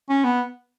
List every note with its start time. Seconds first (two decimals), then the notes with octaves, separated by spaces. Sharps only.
0.09 C#4
0.24 B3